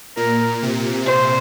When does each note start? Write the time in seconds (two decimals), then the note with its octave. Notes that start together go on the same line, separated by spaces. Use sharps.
0.17 A#2 A#4
0.63 C3
1.06 C5